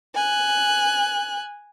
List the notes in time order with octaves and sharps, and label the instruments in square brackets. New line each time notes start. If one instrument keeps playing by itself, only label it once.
[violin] G#5 F#6